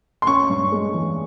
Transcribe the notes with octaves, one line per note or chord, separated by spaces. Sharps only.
C6
C#4 C#6
G2
G#3
E3